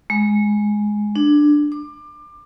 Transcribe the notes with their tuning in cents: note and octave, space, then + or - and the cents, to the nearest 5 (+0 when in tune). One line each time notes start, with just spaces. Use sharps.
G#3 +5
D4 +10
D6 +25